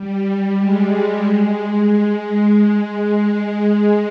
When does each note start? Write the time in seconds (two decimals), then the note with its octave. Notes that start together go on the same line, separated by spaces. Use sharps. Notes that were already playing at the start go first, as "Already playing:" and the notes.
Already playing: G3
0.56 G#3
3.22 G#3